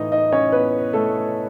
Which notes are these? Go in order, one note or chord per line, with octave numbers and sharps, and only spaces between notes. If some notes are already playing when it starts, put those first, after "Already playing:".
Already playing: A2 E3 D#4 D#5
D#4 D#5
C#4 C#5
B3 B4
A3 A4